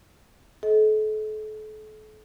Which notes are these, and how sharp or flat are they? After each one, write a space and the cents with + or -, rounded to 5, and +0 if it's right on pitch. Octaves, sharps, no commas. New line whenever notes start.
A4 -35 D#5 +25